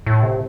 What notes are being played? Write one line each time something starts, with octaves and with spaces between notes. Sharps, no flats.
A2
C3